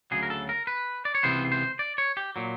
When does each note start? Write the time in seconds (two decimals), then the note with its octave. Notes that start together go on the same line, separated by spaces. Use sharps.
0.11 D2 C#3 F#3 G#4
0.23 A#4
0.30 A4
0.49 A#4
0.67 B4
1.05 D5
1.15 C#5
1.23 C#2 C3 E3 B3 C5
1.52 C5
1.79 D5
1.98 C#5
2.17 G4
2.36 A#2 F#3